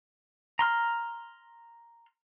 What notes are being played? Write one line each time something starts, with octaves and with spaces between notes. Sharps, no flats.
A#5 C6 F6